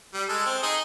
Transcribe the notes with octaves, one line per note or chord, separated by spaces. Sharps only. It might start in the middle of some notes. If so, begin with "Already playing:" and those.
G3
G#3 A4
C4
D#4 G#4 D#5